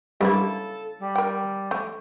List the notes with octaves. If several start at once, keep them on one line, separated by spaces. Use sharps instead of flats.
G2 C#3 A#3 E4 A4
G3
A#4 G5
A3 G5